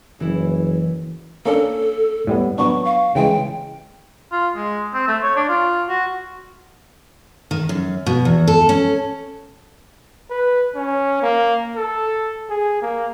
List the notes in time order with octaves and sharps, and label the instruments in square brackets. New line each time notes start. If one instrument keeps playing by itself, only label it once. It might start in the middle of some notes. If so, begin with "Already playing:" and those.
[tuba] F#1 [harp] E3 E4
[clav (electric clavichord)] A#3 C#4 D4 [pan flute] A4
[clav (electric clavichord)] A2 G3 B3
[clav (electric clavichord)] F#3 B3 D4 [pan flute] C#6
[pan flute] F5
[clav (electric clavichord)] C#3 E3 G#3 [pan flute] G5
[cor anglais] F4
G#3
C4
A3
C#5
D4
F4
F#4
[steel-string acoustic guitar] D#3
F#2
B2
E2
A4
C#4
[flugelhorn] B4
C#4
A#3
A4
G#4
A#3